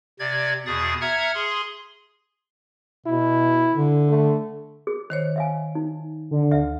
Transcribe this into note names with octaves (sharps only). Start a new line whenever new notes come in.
C3 D5 G#6
E2 B2 G#4 D#6 A6
E5 F#5 A#5 F6 G#6
G#4 C6
B2 E4
D3
A3
G#4
D#3 C5 C#5
E5 F5 G#5
D#4
D3
D2 E5